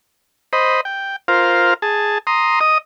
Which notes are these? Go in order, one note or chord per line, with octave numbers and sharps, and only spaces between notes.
C5 D#5 B5
G5
F4 A#4 C5 F5
G#4 A5
A#5 C6 D#6
D#5 D#6